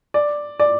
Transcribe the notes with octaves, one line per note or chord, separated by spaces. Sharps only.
D5
D5